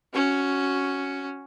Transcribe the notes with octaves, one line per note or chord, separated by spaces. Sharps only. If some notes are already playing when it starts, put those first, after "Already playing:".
C#4 F#4